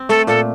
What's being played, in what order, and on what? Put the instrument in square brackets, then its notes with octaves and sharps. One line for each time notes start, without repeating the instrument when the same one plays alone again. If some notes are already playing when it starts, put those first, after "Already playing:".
Already playing: [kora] C4
[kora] A3 [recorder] A4
[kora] A#2 [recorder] A4